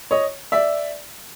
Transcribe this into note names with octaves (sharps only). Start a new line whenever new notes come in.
C#5 D#5
D5 E5